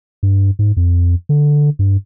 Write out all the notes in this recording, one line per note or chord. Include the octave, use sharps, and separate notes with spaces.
G2
G#2
F2
D3
G2